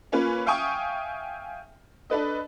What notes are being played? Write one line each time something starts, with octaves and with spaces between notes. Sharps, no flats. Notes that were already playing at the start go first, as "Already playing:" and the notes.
A#3 C#4 F4 B4
E5 F5 G5 G#5 C#6 D#6
D4 A4 B4 D#5